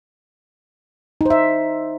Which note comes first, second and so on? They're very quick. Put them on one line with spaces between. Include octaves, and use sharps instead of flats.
D#4 C5 E5